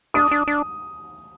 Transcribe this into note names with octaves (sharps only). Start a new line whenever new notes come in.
D4 D#6
D4
D4